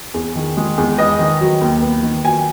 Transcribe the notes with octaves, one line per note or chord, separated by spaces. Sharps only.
E2
D#3
G#3
E2
B3 D#5
D#3
F#3
D#2
B3
D#3
F#3 G#5